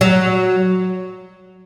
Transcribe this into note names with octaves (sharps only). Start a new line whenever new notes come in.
F#3